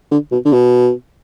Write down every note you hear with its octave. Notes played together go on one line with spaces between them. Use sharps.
D3
B2
D3
B2